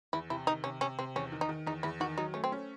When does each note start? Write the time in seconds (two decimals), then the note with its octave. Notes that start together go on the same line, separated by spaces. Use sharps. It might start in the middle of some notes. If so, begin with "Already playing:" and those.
0.13 E2 E4
0.30 C3 E4
0.47 D#3 D#4
0.64 C3 C#4
0.81 C3 C#4
0.99 C3 C4
1.16 E2 C#4
1.32 D#3
1.41 D#4
1.49 D#3
1.67 E2 D#4
1.83 E2 E4
2.00 D#3 F#4
2.18 F#3 D#4
2.34 A3 C#4
2.44 C4
2.52 C#4